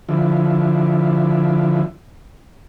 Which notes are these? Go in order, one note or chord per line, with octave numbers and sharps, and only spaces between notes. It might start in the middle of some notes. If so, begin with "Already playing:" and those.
D3 F3 E4